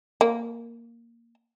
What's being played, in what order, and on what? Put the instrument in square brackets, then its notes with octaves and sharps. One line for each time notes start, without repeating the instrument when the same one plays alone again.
[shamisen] A#3